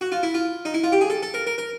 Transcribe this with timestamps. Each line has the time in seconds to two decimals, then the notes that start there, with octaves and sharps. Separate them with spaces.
0.01 F#4
0.12 F4
0.23 E4
0.34 F4
0.65 D#4
0.74 E4
0.84 F4
0.92 G4
1.01 G#4
1.10 A4
1.23 A4
1.34 A#4
1.47 A#4
1.58 A#4